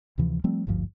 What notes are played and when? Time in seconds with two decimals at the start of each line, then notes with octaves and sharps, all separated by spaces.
0.18 D2 C3 E3 F3
0.44 F3 G3 A3 C4
0.67 G#1 D2 G2 F3